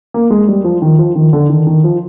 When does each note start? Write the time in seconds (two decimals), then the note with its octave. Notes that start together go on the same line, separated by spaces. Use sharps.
0.14 A#3
0.30 G#3
0.48 G3
0.64 F3
0.82 D#3
0.99 F3
1.15 D#3
1.33 D3
1.50 D#3
1.67 D#3
1.84 F3